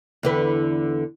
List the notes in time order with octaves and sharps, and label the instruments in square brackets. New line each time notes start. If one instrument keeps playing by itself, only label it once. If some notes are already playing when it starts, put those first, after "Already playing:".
[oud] E2 D3 B4